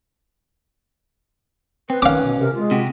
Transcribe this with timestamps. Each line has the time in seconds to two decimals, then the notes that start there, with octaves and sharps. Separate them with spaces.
1.90 C4 B4
2.02 D#3 C#4 F5 D6
2.24 B2
2.39 C3 A#4
2.54 G#3 F4
2.71 C3 F#4 G4